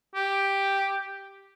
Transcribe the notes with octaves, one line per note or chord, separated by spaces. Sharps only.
G4